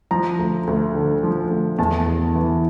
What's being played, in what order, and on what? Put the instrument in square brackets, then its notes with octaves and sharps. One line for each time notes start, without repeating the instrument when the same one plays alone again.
[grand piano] F3 A#5
D2
D2
D3
F3
D2
E2 A5
E2
E3